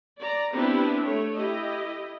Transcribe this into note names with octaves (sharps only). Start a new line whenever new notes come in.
D5 A#5
B3 C4 D4 E4 G4 B4
A3 C#5
E4 G4 D#5